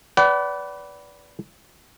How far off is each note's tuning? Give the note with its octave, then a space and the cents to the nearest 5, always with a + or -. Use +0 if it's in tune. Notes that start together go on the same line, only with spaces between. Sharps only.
B4 +0 D5 -25 F#5 +40